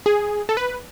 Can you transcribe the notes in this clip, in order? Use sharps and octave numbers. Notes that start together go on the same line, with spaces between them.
G#4
A4
B4